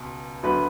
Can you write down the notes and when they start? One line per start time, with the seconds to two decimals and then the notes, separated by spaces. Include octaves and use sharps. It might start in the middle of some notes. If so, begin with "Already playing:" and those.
Already playing: C#2 B2
0.43 D2 D3 F#3 B3 B4